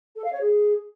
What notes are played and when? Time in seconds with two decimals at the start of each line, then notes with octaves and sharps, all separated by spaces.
0.16 A4
0.24 F5
0.32 C#5
0.41 G#4